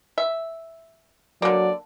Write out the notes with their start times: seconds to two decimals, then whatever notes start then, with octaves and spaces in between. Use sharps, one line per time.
0.18 E5
1.42 D3 F#3 A#3 D5